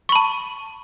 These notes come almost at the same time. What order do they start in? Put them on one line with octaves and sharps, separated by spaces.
C#6 B5 A5